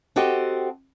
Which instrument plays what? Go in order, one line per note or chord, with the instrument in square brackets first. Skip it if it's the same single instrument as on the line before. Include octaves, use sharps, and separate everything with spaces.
[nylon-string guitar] C4 F#4 G4 A4 D#5